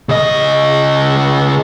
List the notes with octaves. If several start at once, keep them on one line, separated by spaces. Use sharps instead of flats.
C#3 D#5